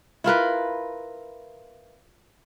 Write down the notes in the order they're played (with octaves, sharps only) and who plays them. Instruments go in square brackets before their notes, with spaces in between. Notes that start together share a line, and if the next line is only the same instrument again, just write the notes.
[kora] E4 F4 A#4 B4